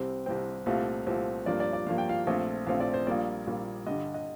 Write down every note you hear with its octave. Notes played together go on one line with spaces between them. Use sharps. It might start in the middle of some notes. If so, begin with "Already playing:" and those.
Already playing: C2 C3 G3 C4
C2 C3 G3 C4 G5
C2 A#2 A3 C4 F5
C2 A#2 A3 C4
G2 F3 A#3 D5
D5
D5
G2 F3 A#3 F5
G5
F5
A#1 A#2 A3 C4
A#1 A#2 A3 C4 F5
D5
C5
A#1 A#2 G3 A#3 D5
A#1 A#2 G3 A#3
G2 D3 G3 D#5
D#5